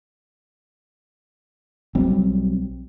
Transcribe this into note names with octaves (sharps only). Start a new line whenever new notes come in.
B1 F#3 G3 C4